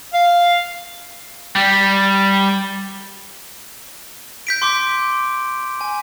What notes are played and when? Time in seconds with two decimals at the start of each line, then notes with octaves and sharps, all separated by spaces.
0.14 F5
1.55 G3
4.47 G6 B6 D7
4.62 C6 D6 B6
5.81 G#5